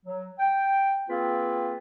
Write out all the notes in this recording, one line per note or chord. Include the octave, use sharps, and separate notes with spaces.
F#3
G5
A#3 C4 F4 G#4 B4 G5